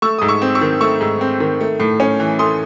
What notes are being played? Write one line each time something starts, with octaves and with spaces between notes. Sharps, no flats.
A3 C#6 E6
G#2 D#6
C#6 E6
C4
C#6 E6
D#3
A3 C#6 E6
G#2
C4
D#3
A3
A2
C#4
E3
A3 C6 D#6